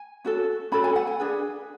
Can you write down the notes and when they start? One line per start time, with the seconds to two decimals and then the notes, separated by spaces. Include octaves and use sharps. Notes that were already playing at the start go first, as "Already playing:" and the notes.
Already playing: G#5
0.25 C#4 F#4 A4
0.72 C#4 F#4 A4 B5
0.84 G#5
0.96 F#5
1.07 G#5
1.20 D4 G#4 B4